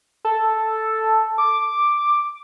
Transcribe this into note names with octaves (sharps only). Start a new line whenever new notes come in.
A4
D6